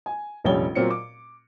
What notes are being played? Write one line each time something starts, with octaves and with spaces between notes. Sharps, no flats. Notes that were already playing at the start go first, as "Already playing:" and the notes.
G#5
F1 A#1 G3 C#4 C#5 G7
A#2 F#3 C4 A#4 C#7
D6